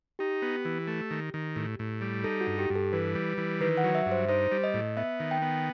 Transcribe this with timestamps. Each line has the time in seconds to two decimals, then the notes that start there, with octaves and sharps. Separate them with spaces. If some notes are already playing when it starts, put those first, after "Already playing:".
0.19 D#4 G4
0.42 B3
0.65 E3
0.87 A3
1.11 D#3
1.34 D#3
1.56 A2
1.79 A2
2.01 G3
2.24 D#4 A4
2.41 F#4
2.47 G2
2.59 G4
2.70 G2
2.75 A4
2.93 E3 B4
3.15 G3
3.38 E3
3.61 D#3 B4
3.77 F#5
3.84 F#3
3.95 E5
4.06 G2
4.12 C5
4.29 D#4 C5
4.52 G3
4.64 D#5
4.74 A2
4.97 B3 E5
5.20 D#3
5.31 G5
5.42 B3